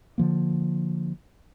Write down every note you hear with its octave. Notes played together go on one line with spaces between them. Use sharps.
D3 F3 A#3